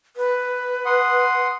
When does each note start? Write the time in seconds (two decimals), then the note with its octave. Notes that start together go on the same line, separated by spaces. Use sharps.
0.17 B4
0.86 F#5 C6 D#6